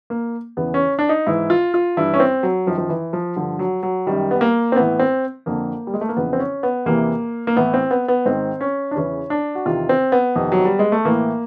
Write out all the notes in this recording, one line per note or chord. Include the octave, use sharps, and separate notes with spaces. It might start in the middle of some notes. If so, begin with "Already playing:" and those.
A#3
E2 C#3 E3 B3
C#4
D4
D#4
G#2 E3 E4
F4
F4
G2 E3 E4
C#4
C4
F#3
F#2 D#3 F3
F3
E3
F3
G2 D3 F3
F#3
F#3
F#2 D#3 G3
B3
A#3
C4
A2 E3 B3
C4
F2 D3 A#3
G3
G#3
A3
A#3
F2 C#3 E3 B3
C4
C#4
B3
E2 C3 E3 A#3
A#3
A2 E3 B3
C4
B3
B3
G#2 D#3 C4
C#4
D4
E2 C#3 E3 C#4
D4
F#4
E2 C3 D#3 F4
C4
B3
F2 C3 D#3
F#3
G3
G#3
A3
A2 E3 A#3